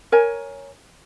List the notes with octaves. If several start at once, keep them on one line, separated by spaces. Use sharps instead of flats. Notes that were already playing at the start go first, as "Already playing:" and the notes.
A#4 C#5 G#5